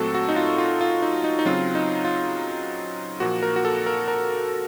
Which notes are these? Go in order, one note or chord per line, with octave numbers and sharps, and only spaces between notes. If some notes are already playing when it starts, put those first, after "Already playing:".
Already playing: A#2 F#3 A3 C4 F#4 A4
F#4
D#4
F4
F4
F4
D#4
D#4
D#4
C#3 F#3 C4 F4
D#4
F4
A#2 F3 A#3 F#4
A#4
F#4
A4
A#4
A#4